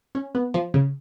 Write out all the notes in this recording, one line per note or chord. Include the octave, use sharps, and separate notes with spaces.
C#4
B3
F3
C#3